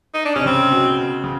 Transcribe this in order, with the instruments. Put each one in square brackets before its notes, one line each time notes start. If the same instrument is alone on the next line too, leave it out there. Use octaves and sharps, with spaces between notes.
[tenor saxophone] D#4
D4
[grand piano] C3 [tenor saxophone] C#4
[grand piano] C#3 [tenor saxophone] C4
[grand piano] B2
C#3